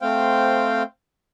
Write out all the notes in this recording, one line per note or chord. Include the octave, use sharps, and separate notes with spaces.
A3 C4 C5 F5 G5